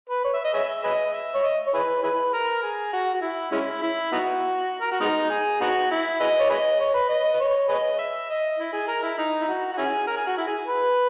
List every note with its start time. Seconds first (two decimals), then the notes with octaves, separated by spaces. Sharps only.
0.09 B4
0.24 C#5
0.33 E5
0.44 D#5
0.54 G#4 C#5 E5
0.84 G#4 B4 D#5
1.13 E5
1.34 C#5
1.43 D#5
1.67 C#5
1.74 E4 G#4 B4
2.03 E4 G#4 B4
2.33 A#4
2.63 G#4
2.93 F#4
3.14 F#4
3.22 E4
3.52 G#3 C#4 E4
3.82 E4
4.12 B3 D#4 F#4
4.81 A#4
4.92 F#4
5.01 G#3 B3 D#4
5.30 G#4
5.61 B3 D#4 F#4
5.91 E4
6.20 G#4 B4 D#5
6.40 C#5
6.50 G#4 B4 D#5
6.80 C#5
6.94 B4
7.09 D#5
7.34 B4
7.40 C#5
7.69 G#4 B4 D#5
7.99 E5
8.29 D#5
8.59 E4
8.73 G#4
8.88 A#4
9.03 E4
9.18 D#4
9.41 E4
9.48 F#4
9.72 F#4
9.78 C#4 E4 G#4
10.07 A#4
10.17 G#4
10.27 F#4
10.38 E4
10.47 G#4
10.67 B4